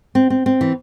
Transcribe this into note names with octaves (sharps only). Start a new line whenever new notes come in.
C4
C4
C4
E3